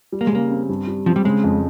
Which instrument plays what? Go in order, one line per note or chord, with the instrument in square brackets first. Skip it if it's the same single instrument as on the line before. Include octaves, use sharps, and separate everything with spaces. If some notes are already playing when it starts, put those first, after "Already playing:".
[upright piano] G3
[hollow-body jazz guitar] A#3
G#3
[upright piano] C#3 [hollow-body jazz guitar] A#3
[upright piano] C4
G2
G3
[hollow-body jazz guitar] F3 [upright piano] C4
[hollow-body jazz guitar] G3
[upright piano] C#3 [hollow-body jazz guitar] G#3
[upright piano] F2